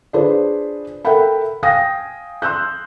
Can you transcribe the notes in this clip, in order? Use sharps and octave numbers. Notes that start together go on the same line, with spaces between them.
D4 F4 G#4 B4 C5
A4 A#4 E5 F#5 G5 B5
F5 G5 G#5 D#6 A#6
C6 E6 F#6 G6